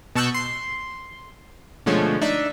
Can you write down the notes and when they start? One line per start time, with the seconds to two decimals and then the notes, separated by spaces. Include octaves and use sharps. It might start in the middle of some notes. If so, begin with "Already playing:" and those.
0.15 B2 A5 C#6 E6 F#6 G6
0.34 C6
1.86 B2 D3 F3 G#3 A3 C#4
2.22 D4 D#4 E5